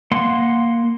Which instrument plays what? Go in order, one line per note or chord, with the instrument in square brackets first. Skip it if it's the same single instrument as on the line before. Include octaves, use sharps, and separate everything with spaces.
[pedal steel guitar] A#3 F#5 C6